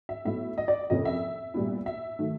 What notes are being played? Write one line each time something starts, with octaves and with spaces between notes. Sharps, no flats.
E5
A2 F#3 B3 E4 E5
D#5
D5
F2 C3 F3 A#3 C#4 D#5
E5
A#2 G3 B3 E4
E5
D#3 F#3 A3